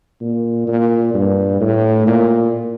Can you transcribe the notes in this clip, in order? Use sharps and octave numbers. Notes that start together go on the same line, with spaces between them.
A#2
A#2
G2
A2
A#2